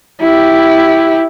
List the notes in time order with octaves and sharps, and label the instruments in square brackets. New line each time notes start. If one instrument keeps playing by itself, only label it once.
[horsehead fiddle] E4 G4